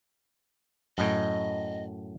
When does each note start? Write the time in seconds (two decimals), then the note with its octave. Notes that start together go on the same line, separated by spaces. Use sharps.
0.98 F#2 A2 D#5